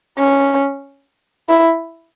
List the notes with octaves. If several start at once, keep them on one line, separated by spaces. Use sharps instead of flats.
C#4
E4